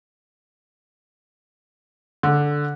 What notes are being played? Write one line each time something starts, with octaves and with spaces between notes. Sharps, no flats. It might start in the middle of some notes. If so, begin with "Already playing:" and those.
D3